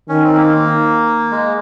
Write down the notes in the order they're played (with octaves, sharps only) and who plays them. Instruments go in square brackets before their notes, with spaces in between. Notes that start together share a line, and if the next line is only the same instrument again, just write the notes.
[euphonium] D#3 [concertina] C#4
[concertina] C4
A#3
G#3